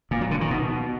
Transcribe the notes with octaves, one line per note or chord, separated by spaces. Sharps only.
A#2
F#3
D3
D#3
B2